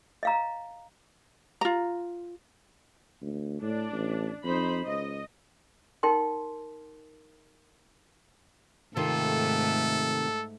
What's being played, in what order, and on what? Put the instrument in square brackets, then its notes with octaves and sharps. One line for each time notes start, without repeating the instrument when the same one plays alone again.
[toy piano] D#5 F5 A#5
[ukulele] F4 A#5
[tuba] D2
[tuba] A2 [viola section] D4
[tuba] A1
[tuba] F2 [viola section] D#4 C5 B5
[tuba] C#2 [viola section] D#5
[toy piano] D#4 A#4 G5 C6
[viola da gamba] G#2 A3 [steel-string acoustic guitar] C3 D#3 F4 [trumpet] A4